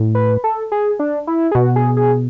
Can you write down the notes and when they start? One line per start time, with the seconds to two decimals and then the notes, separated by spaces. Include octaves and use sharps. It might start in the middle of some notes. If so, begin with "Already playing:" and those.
Already playing: A2
0.15 B4
0.44 A4
0.72 G#4
0.99 D4
1.27 E4
1.51 G#4
1.55 B2 F#4
1.76 G#4
1.97 G#4